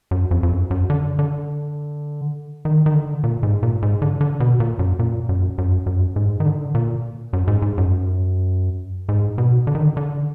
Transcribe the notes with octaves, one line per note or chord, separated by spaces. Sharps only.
F#2
F2
F2
F#2
F#2
D3
D3
D#3
D#3
D3
A#2
G#2
A#2
G#2
D3
D3
B2
A#2
F#2
A#2
F#2
F#2
F#2
G#2
D#3
D3
A#2
F#2
G#2
G#2
F#2
G#2
B2
D3
D#3
D3
D3